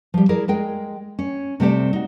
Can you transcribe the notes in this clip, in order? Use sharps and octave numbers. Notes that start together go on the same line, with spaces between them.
F3 G3
E4 G#4 A#4 D5
G#3 G#4 A#4 G5
C#4
C3 G3 A3 C4 G4 D5
D#4 F#4